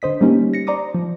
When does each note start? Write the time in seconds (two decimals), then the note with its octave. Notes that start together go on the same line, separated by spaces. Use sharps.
0.02 D3 C5 D#5 B6
0.21 G3 A#3 C#4 D#4 G4
0.54 A#6 C#7
0.67 C5 D5 A#5 D6 D#6
0.95 F3